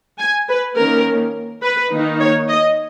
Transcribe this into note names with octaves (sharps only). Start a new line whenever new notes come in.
G#5
B4
D#3 A#3 C#4 A#4
B4
D#3 A#3 D#4
C#5
D#5